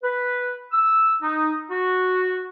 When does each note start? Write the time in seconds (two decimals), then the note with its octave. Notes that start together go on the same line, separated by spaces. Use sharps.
0.03 B4
0.72 E6
1.22 D#4
1.70 F#4